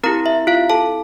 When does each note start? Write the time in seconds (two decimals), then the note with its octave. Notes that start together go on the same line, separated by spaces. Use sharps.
0.03 C4 E4 G4 A#4 A#5
0.26 E5
0.47 F4 F5
0.70 A4 A5